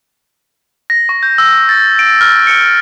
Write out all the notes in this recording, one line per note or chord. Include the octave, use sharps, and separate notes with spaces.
A#6
C#6
G6
E6
A6
D7
F6
C#7